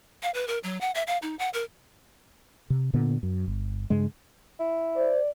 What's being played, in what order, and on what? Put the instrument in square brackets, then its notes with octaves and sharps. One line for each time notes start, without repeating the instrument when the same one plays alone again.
[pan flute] F5
B4
A#4
F#3
F#5
E5
F5
D#4
F#5
A#4
[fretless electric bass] C3
A#2 D3 B3
F#2
G1
G2 C#3 G#3
[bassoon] E4
[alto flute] C5 [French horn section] D5